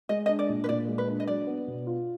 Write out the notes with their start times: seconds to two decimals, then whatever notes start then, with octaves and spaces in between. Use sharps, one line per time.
0.09 G#3 D#5
0.26 D#5
0.29 D4
0.39 D5
0.49 A#2
0.64 B4
0.69 A#2 D5
0.88 G#3
0.98 B4
1.08 D4
1.20 D#5
1.27 F#3 D5
1.47 B3
1.67 B2
1.87 F4